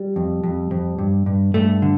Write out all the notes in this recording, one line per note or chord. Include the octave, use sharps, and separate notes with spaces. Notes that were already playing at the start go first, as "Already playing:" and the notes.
Already playing: G3
F2
F2
F2
G2
G2
G2 A3
D3